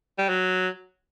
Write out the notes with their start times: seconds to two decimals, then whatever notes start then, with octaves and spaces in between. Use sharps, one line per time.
0.18 G3
0.29 F#3